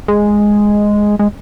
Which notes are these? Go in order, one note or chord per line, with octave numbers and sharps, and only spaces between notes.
G#3
G#3